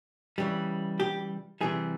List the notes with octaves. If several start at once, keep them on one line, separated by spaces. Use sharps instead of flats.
C#3 E3 G3
G4
C3 E3 G3 G#4